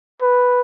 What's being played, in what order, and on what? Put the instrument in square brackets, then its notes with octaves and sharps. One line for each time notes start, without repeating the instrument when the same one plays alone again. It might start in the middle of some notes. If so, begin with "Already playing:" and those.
[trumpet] B4